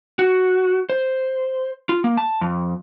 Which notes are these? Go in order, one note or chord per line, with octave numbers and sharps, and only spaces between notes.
F#4
C5
F4
A#3
A5
F2